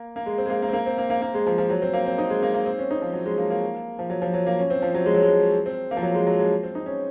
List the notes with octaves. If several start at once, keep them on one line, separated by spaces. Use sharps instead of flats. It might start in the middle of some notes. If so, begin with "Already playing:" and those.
Already playing: A#3
A#3
G#3
C4
G#3
A#3
A#3
C4
A#3
C4
A#3
A#3
A#3
G#3
F3
F3
F#3
C4
A#3
C4
D#4
G#3
A#3
A#3
C4
C#4
D#4
F3
F#3
G#3
A#3
A#3
F3
F#3
F3
F#3
A#3
C#4
C4
F3
F#3
G#3
F#3
G#3
C4
A#3
F3
F#3
G#3
F#3
G#3
C4
D#4
C#4